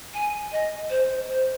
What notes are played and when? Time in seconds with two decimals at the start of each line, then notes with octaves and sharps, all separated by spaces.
0.14 G#5
0.51 D#5
0.89 C5
1.28 C5